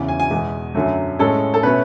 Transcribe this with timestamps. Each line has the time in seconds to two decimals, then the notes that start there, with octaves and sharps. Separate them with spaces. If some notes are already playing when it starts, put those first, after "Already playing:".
Already playing: E2 C#3 E3
0.08 G#5
0.20 G#5
0.30 E2 B2 G#3
0.75 F#2 D3 F#3 A3
1.19 A2 G#3 C#4 A4
1.54 A4
1.63 B2 A3 C#4 B4